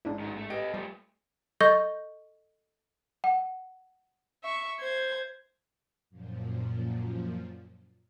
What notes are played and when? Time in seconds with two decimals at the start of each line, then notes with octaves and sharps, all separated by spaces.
0.05 A1 G#2 D4 E4
0.20 D#3 F#3
0.37 A3
0.50 G4 A4 B4 D#5 D7
0.74 F3 G3 A3
1.61 A4 D#5 C#6 G6 A#6 G7
3.24 F#5
4.44 E5 C#6
4.80 C5 G#6
6.10 F#2 A#2 F3